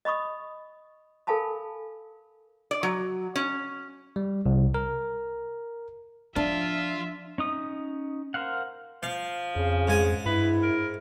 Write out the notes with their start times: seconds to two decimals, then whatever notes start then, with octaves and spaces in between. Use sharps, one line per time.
0.05 D#5 B5 C#6 D#6
1.27 A4 A#4 F5 G#5 A5 B5
2.71 D5
2.83 F#3
3.36 C#4
4.16 G3
4.46 C2
4.74 A#4
6.36 F3 D4 F4 E5
7.38 C#4 D#4 D#6
8.34 A#4 C5 F5 F#5
9.03 F3 F5
9.56 F2 C#3
9.88 G#2 G#5 D#6
10.26 G2 E4 B4
10.63 A#4